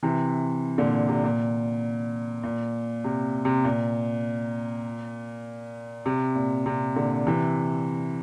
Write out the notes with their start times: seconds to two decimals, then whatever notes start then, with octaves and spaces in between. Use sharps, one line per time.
0.03 C3 E3
0.78 A#2 D3
1.09 C3
1.24 A#2
2.44 A#2
3.04 C3
3.45 C3
3.65 A#2
6.06 C3
6.35 A#2
6.66 C3
6.96 A#2 D3
7.27 C3 E3